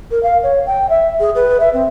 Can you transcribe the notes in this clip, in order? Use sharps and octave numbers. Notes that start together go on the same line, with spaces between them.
A#4
F5
C#5
G5
E5
G#4
B4
E5
C4